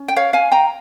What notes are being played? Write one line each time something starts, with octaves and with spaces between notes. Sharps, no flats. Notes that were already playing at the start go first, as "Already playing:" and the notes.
Already playing: C#4
G5
C#5 F5
F5 G#5
G5 A#5